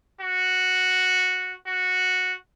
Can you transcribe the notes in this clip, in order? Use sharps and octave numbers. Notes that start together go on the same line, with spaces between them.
F#4
F#4